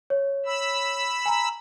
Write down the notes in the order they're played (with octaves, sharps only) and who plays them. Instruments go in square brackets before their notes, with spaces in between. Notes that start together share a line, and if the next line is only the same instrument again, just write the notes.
[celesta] C#5
[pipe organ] B5 E6
[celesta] G#5 A#5